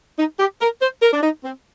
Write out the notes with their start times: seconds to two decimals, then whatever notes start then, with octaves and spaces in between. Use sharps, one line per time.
0.19 D#4
0.39 G4
0.61 A#4
0.82 C5
1.02 A#4
1.13 D4
1.23 D#4
1.45 C4